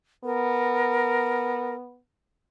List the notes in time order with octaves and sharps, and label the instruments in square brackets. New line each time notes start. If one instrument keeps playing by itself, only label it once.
[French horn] B3 [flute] A#4